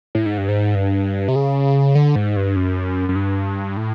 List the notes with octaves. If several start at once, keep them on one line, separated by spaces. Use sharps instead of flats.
A2
G#2
G2
G#2
G2
C3
C#3
D3
G#2
G2
F#2
F#2
G2
A2